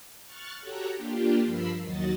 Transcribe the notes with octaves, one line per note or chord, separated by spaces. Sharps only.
C#6 F6 F#6 A6
F#4 G4 A4 C#5 A#5 F#6
A#3 D4 F4 G4
G2 F3 A#4 B5 E6 C7
D#2 F#3 F#4 D#5 A6